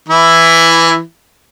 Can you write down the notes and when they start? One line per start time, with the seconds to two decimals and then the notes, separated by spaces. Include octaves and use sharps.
0.08 E3 E4